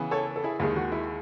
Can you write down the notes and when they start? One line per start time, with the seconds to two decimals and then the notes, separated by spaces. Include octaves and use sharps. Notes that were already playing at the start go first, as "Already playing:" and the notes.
Already playing: C#3 E3 B3
0.11 A4 C#5
0.36 A4
0.44 E4 G#4
0.59 D#2 D#3 G#3 E4 G#4
0.76 F#4
0.92 E4